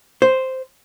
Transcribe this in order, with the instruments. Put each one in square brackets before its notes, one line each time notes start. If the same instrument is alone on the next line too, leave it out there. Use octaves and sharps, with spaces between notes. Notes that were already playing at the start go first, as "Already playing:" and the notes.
[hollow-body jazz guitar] C5